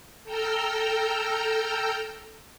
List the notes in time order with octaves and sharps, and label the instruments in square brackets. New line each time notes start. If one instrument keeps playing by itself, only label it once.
[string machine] A4 G5 A#5 E6 F6 G6